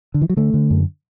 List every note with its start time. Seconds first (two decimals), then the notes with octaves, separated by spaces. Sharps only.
0.14 D3
0.22 E3
0.30 F#3
0.37 D3 A3
0.54 D3
0.71 F#2